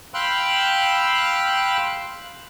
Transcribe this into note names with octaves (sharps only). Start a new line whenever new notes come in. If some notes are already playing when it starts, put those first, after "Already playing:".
F5 G5 B5 C6 E6 F#6